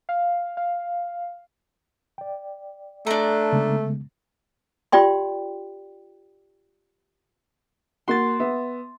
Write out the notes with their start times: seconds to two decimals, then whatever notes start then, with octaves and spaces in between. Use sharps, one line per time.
0.09 F5
0.57 F5
2.18 D5 G5
3.07 A3 D4 A#5
3.52 C#3 G#3 B3
4.92 F4 G4 D5 G5 C6
8.08 A#3 F#4 C6 A6
8.39 B3 E5